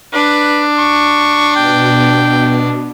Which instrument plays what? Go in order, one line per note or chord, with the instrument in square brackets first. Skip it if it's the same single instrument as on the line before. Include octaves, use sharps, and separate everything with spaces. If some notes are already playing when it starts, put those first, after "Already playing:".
[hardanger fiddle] D4 [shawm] B4
[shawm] C#6
[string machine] B2 [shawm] G5